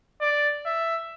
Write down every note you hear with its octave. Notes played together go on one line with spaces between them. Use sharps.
D5
E5